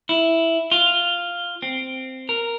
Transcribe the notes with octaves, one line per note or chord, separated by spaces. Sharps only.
E4
F4
C4
A#4